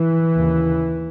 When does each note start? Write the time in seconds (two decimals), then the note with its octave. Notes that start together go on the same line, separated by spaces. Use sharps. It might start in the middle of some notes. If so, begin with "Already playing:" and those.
Already playing: E3
0.33 D#2 C#3